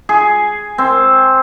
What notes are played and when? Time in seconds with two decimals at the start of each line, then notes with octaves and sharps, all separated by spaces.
0.09 G#4
0.78 C4